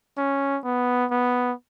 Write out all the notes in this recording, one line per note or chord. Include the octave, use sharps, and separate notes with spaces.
C#4
B3
B3